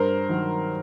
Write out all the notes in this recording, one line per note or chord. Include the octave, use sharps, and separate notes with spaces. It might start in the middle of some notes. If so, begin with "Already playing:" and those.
Already playing: G2 A#4 C5
D#3 F#3